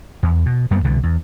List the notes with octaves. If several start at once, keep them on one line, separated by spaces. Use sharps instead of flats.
E2
B2
F#2 G3 A#3 B3
C2 B2 D3 E3
E2